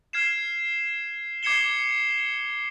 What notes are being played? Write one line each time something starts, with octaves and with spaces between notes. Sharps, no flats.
F6 G#6 C7 E7
D6 G#6 C7 C#7 E7 G7